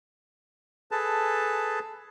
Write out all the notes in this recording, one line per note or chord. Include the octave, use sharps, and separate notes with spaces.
G#4 A4 B4 A5